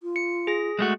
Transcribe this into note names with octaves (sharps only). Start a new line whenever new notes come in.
F4
C#7
G#4 A#6
G#3 A3 F#4